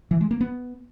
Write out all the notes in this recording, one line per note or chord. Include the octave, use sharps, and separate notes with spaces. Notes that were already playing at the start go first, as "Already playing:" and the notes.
E3
G#3
A#3
B3